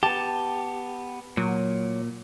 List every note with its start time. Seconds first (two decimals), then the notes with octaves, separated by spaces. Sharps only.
0.03 B3 G4 A5
1.37 A#2 F#3